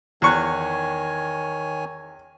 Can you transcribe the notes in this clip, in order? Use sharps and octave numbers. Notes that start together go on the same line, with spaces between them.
E2 D#3 C#5 G#5 C#6 F#6